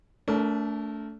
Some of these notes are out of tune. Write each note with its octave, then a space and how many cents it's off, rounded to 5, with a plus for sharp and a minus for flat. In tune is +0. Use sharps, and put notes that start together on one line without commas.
A3 +0 D4 -40 A#4 +0